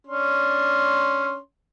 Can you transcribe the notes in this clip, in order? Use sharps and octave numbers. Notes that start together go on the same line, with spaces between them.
C#4 D4 C6